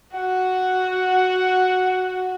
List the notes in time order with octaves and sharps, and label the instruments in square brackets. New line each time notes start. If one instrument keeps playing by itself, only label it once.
[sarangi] F#4 [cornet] F#5